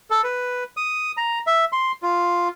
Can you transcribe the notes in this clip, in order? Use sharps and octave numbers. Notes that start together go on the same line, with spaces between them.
A4
B4
D#6
A#5
E5
C6
F4